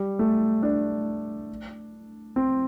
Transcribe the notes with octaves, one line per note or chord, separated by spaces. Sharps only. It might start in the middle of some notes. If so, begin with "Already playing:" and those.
Already playing: G3
A3
D4
C4